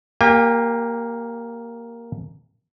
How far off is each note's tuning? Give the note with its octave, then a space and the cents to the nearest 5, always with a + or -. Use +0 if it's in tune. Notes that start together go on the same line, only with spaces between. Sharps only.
A#3 +0 G4 +0 G#5 -45